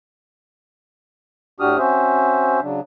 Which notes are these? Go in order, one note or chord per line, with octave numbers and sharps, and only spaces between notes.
A2 D4 F#4 G4 D#6 F6
C4 C#4 F#4 C5 E5
C#3 F#3 D4